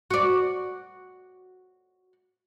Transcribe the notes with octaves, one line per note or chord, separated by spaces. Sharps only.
F#4 D5